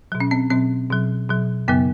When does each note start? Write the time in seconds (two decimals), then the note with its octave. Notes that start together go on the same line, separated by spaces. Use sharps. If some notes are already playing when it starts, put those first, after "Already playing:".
0.12 B2 F#3
0.20 C#4
0.31 C4
0.50 B2 F#3 C4
0.90 B2 F#3
1.29 B2 F#3
1.68 F#2 C#3 F#3 B3